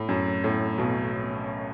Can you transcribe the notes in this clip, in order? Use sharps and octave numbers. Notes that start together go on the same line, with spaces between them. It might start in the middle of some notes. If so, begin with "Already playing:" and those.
Already playing: A2
F#2
A2
B1 B2